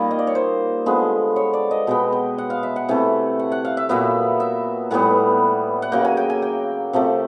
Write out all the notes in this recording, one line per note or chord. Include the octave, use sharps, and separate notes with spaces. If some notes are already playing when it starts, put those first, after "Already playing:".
Already playing: A#2 D#3 G3 A#3
D#5
D5
C#5
C5
D3 F3 G#3 B3
C#5
D5
D#5
B2 G#3 B3 G5
G5
F#5
F5
E5
F#5
C3 E3 A3
F#5
F#5
F5
E5
A#2 F#3 B3 E5
E5
A2 E3 G3 B3 F#5
F#5
C#3 F#3 A#3 G5
G#5
G5
G#5
G5
C3 F3 A3